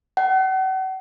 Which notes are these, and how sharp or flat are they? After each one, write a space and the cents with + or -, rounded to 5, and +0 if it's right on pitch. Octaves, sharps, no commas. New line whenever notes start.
F#5 +40